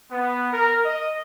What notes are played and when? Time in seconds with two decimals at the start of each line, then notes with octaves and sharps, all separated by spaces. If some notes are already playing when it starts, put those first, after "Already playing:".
0.11 B3
0.53 A#4
0.85 D#5